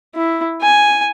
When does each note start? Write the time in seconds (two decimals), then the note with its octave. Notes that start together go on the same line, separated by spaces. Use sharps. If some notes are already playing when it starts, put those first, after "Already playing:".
0.15 E4
0.62 G#5